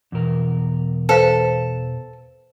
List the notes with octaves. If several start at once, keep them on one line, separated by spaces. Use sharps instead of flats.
E2 B2 A#4
A4 B4 C5 F5